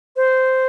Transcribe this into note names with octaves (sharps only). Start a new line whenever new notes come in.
C5